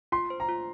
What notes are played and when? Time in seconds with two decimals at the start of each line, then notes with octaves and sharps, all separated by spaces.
0.12 F4 C6
0.30 C5
0.40 A#5
0.49 F4